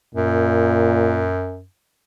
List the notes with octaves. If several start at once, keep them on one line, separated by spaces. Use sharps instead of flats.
F#2 A#2